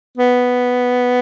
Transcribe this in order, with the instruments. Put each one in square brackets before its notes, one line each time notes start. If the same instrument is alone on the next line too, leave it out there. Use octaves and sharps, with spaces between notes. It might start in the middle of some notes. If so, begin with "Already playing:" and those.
[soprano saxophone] B3